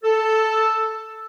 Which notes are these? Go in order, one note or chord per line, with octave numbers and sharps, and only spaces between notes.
A4